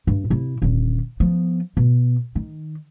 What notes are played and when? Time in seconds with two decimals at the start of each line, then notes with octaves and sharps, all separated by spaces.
0.07 G2
0.30 C3 E4
0.62 D#1 D3
1.20 F3 B3
1.77 B2
2.35 D#3